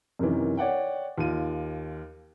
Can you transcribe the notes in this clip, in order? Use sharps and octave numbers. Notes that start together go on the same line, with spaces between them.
F#2 C3 D#3 E3
C#5 D5 F#5 G5
D#2 F4 D#7